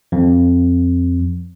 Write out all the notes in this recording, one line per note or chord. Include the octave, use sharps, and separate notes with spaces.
F2